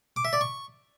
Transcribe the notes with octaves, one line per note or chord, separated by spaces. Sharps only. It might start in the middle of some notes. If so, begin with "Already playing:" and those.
D6
E5
D5
C#6